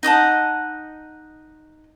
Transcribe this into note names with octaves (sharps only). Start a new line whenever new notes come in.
D#4 D#5 F#5 A5